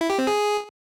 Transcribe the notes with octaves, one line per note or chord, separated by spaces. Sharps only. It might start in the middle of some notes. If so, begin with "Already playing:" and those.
E4
G4
C4
G#4